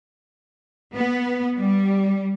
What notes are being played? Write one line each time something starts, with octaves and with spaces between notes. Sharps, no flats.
B3
G3